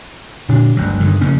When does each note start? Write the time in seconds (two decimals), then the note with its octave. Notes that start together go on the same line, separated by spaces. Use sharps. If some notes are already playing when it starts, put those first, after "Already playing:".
0.49 A#2 D3 D4
0.77 G1 D2 F#3
1.00 G2 D3 D#3
1.21 F1 C#3 A#3 C#4